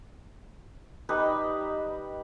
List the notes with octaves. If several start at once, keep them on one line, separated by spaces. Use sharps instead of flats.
G3 D#4 B4